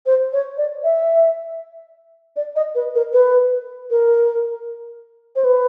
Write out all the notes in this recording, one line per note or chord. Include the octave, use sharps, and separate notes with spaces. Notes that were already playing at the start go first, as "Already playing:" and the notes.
C5
C#5
D5
E5
D5
D#5
B4
A#4
B4
A#4
C5
B4